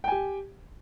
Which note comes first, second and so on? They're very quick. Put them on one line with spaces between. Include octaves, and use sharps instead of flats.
G5 G#5 G4